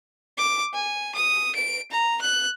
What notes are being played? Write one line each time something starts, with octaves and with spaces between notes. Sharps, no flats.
D6
G#5
D#6
D7
A#5
F#6